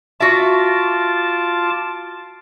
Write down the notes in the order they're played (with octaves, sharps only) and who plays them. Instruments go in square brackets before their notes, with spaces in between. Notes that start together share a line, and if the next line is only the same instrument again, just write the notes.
[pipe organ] F4 A5 D6 [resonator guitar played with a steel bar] F#4 E5